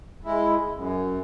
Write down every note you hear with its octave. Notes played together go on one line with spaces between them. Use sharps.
G#3 E4
F#2